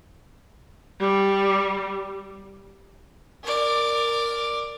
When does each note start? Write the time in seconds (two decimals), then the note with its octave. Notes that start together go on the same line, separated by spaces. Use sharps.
1.00 G3
3.44 A#4 D5